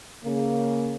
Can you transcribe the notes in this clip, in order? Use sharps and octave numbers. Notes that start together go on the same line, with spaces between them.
C#3 A#3